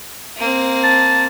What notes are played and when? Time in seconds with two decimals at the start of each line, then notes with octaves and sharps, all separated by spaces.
0.38 A#3 C4
0.83 A5